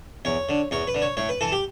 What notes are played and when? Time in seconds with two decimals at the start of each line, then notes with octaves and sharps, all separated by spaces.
0.25 E2 C#5
0.49 D3
0.71 E2 C#5
0.87 B4
0.95 D3
1.02 C#5
1.17 A2 C#5
1.29 B4
1.41 E3 A4
1.52 G4